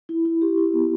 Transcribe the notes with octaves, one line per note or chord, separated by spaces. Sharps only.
E4
E4
G4
E4
B3